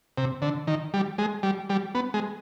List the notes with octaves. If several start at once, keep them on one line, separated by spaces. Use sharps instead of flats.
C3
D3
D#3
G3
G#3
G3
G3
B3
G#3